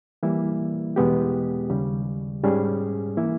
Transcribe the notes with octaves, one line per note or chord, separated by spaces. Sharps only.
E3 G3 A#3 E4
E2 B2 G#3 B3 G4
D#2 C#3 G3
G#2 G3 C#4 G#4
E3 A#3 E4